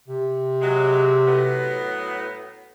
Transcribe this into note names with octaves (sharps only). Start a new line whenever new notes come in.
C3
F#3 G#3
A2 F#3 B3